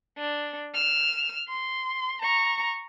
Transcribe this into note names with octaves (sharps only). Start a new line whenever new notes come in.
D4
F6 E7
C6
A#5 C#6